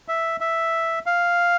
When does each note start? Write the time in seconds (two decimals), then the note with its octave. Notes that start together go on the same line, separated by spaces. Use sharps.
0.08 E5
0.41 E5
1.06 F5